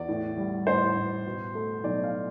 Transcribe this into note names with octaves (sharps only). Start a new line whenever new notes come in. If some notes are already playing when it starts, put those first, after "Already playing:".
Already playing: E2 D5
A2
G3
A1 C5
A1
B2
A3
B1 D5
F5